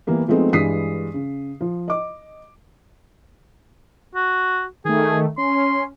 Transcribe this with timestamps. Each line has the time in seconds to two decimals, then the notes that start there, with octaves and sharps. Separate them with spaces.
0.07 E3 G3 A#3 B3
0.28 F3 G#3 A3 B3 C4 D#4
0.53 G2 E3 G#3 D#6 B6 C7
1.14 C#3
1.61 F3
1.88 D#5 D6
4.15 F#4
4.85 D#3 A3 G#4
5.38 C#4 C6